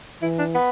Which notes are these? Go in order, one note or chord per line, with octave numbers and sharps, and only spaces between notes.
E3 E4
D4
B3